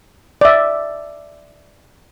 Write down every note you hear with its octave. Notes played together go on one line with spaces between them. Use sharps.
D5 E5